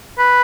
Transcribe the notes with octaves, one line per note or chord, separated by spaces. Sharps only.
B4